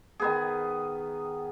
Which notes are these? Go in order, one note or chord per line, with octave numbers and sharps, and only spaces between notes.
D#3 B3 G#4